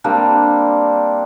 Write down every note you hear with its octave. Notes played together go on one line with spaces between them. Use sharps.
G3 A#3 C4 D4